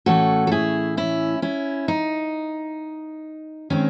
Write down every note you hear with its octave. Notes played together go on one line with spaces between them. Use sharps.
A2 E3 A3 C#4 F#4 A4
A4
E4 G#4
C#4 E4
C#4 E4
D#4
D#3 G#3 C4 C#4